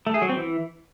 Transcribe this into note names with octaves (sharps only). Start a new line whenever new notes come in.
A3
G#4
F#3
C4
E3